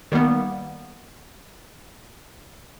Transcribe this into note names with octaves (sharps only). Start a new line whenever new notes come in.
D#3 G3 A#3 B3